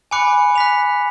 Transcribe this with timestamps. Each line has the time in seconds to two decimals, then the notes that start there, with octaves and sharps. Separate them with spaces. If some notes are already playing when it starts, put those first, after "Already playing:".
0.11 G#5 B5 D6 F#6 C#7
0.55 F#6 B6 F7